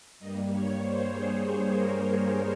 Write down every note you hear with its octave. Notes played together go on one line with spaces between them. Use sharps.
G2 G3 A#3 D#5
C#5
C5
G#4
G#4
A#4